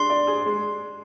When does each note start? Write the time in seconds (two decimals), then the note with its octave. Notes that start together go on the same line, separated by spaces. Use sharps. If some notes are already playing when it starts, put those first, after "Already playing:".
Already playing: D4 G#4 C6
0.10 D5
0.27 G#4
0.46 G#3